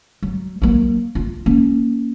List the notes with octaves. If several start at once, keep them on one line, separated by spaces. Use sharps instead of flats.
F#3
F#3 A#3
F4
A#3 C#4